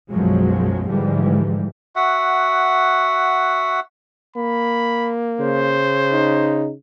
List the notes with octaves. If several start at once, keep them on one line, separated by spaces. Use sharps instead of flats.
B1 F#2 F3 F#3 G#3
G#2 D3 E3 F3 G3 G#3
F#4 E5 F#5
A#3 B5
C#3 C5
D#4